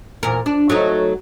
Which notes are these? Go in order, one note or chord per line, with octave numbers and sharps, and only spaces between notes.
E2 A#2 A#4
D4
F#3 A3 D#4